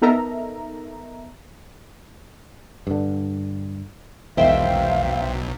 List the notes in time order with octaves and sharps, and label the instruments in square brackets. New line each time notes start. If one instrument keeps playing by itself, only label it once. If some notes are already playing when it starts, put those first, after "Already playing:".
[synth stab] B3 D#4 A4 A#4 E5 A#5
[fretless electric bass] G2 D3
[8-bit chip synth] B1 [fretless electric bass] E2 G#2 D#3 [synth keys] C5 E5 G5 [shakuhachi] F5